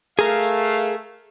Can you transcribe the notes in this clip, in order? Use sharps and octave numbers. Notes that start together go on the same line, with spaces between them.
A3 G#4 A#4 F5